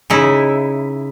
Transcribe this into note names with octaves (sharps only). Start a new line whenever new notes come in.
C#3 D#4 E4